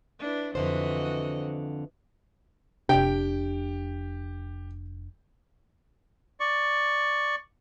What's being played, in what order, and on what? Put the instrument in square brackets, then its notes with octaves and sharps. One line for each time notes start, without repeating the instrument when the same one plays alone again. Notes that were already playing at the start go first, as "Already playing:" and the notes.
[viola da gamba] D4 E4 B4
[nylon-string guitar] F2 D3 C5 [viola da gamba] E3 F#4 D#5
[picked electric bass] F1 D4 [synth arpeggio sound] C3 [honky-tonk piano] G4 [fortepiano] G5
[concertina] D5 C#6